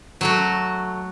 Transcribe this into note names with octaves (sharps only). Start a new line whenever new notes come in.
F#3 A3 F#4